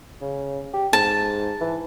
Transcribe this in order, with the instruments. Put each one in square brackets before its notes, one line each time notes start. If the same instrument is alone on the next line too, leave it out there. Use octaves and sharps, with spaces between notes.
[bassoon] C#3
G4
[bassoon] G#2 [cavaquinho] A5
[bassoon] E3